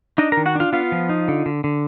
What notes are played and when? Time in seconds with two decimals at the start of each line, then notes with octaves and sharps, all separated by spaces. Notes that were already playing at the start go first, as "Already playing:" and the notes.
0.18 D4 D#4 D#5
0.32 A#4 A#5
0.37 D#3
0.46 F#4 F#5
0.55 D4 F4 F5
0.73 B3 F4 F5
0.92 F3
1.09 D#4
1.28 D3
1.46 D3
1.64 D3